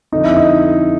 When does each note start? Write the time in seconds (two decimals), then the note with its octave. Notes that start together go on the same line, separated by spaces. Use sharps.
0.12 F2 D3 F3 D#4
0.25 E4
0.37 D#4